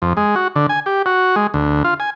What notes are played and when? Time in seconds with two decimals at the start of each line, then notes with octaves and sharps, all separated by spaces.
0.02 F2
0.17 G#3
0.36 F#4
0.56 D3
0.69 G#5
0.86 G4
1.06 F#4
1.36 G#3
1.54 D2
1.84 F4
2.00 G#5